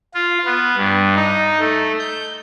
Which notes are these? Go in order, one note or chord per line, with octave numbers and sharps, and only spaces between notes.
F4
B3
G2
D#4
A3
G6